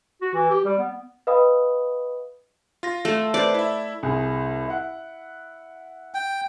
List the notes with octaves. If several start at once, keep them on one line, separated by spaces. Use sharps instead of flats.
F#4
E3
G4
G3
B3
B4 D#5 F5 G5 B5 D#6
F4 A#6
A3
B4 C5 D5
E4 E5
C2 G#4
E4 F#5
G5